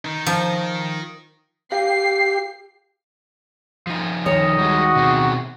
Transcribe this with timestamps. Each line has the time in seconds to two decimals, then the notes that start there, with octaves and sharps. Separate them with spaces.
0.05 D#3 D#4
0.26 F3
1.72 G4 F5 C7
3.87 F3 D#4
4.26 D2 D#3 C#5 D#5
4.58 G3 G#3 F#4
4.95 B2 C4 G#4